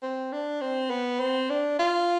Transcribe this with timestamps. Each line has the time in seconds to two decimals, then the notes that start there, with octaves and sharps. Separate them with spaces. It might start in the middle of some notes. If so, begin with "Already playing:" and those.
0.02 C4
0.32 D4
0.61 C4
0.90 B3
1.20 C4
1.50 D4
1.79 F4